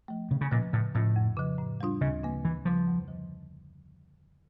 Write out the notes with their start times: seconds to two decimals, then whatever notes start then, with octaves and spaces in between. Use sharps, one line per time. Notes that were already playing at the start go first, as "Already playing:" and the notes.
0.08 F3 A3
0.31 D2 C#3
0.41 C#3
0.51 A#2 C#3 F3 A#3 C#4
0.73 A2 C#3
0.94 A2 F3 C#4 F4
1.16 F2
1.37 C#3 F3
1.58 A2
1.81 G3 D4 F4
2.01 D2 C#3
2.23 C#3 F3 A#3
2.44 D2 E3
2.65 C#3 F3 G3
2.87 F2
3.08 D3 F3